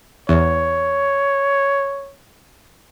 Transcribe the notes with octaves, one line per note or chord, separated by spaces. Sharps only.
E2 C#5